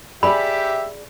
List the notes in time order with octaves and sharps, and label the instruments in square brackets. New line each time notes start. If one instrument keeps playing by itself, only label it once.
[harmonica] G4 E5 [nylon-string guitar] G#4 D5 [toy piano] B5